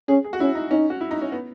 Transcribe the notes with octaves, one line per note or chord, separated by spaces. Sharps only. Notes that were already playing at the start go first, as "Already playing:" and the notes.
C#4 G#4
G#4
F#4
C#4 E4
D#4
C#4 D#4
F#4
E4
D#4
C#4
B3